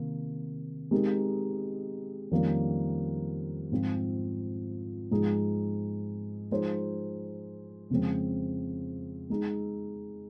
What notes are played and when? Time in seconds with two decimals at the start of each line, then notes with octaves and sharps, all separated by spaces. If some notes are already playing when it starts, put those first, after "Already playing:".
Already playing: C3 D#3 A#3
0.91 G#3 C4 D#4 G4 A#4
2.31 F2 D#3 G3 A#3 C#4
3.72 G#2 F3 C4 F4
5.11 G#2 F3 G#3 D#4 G#4
6.51 F3 G#3 D#4 G#4 C5
7.90 F2 C#3 G#3 C4
9.30 G#3 D#4 G#4